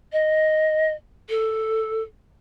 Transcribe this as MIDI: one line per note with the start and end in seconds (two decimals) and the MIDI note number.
0.12 0.91 75
1.29 2.02 69